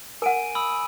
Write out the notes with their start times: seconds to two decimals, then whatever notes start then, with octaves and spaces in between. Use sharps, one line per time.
0.22 A#4 F#5 G#5 D7 D#7
0.55 B5 D#6 E6
0.72 G#5